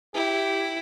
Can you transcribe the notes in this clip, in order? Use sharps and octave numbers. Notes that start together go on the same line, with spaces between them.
E4 G4